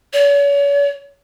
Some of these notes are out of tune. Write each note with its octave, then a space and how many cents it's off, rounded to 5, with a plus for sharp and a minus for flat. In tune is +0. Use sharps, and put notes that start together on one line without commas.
C#5 +40